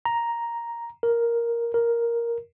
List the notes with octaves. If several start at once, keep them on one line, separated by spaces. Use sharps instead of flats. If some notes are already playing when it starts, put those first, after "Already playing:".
A#5
A#4
A#4